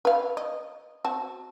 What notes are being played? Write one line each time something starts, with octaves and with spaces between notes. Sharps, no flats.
B4 F5
D#5
C4 F#4 A5